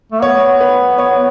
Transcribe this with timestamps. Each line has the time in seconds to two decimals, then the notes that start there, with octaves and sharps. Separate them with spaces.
0.12 A3
0.22 B3 C#5
0.61 B4
0.98 C#5